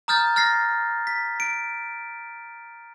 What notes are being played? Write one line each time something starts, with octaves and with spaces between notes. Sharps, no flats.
A#5 D#6 F6 G6 A6
F6 A6 A#6 C7
B6
D7